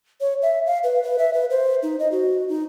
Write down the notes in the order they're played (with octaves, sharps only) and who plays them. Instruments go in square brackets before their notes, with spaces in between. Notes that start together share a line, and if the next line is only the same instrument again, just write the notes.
[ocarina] C#5
E5
F5
B4
B4
E5
B4
C5
D#4
D#5
F#4
D#4